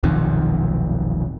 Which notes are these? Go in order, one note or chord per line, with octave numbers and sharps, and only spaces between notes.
D#1 B1 F2 D#3